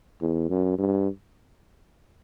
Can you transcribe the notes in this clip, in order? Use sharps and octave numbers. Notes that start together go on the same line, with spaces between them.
E2
F#2
G2